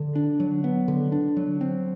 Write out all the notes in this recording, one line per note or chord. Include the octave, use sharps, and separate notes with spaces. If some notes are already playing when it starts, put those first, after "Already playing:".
Already playing: D3
D4
F#3
B3
D3
D4
F#3
C4